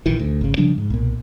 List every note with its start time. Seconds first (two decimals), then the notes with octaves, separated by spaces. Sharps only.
0.06 A#1 D#3 E3
0.19 D2
0.41 G#1 C#3
0.58 C#3 F3 G3 D4
0.78 G#2
0.90 B1 A#2